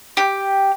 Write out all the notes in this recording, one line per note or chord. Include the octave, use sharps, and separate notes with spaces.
G4